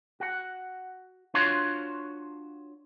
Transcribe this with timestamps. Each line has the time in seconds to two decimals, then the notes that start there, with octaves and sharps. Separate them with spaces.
0.20 F#4 F#5
1.34 D4 F4 F#4 C5 C#5 F5